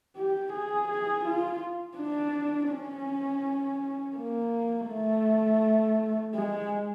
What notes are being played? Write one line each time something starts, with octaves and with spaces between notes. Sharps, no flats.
G4
G#4
G#4
F4
D4
C#4
A#3
A3
G#3